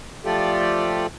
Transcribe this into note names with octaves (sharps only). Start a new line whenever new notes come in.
F3 A3 F4 G4 A4 D5